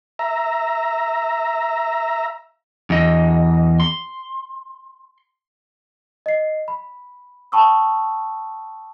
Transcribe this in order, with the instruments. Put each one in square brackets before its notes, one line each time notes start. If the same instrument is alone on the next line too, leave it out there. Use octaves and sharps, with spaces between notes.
[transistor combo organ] E5 A#5
[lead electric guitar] E2 D#5
C6
[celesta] D#5 C7
B5
G5 A5 B5 C#6 D#6 E6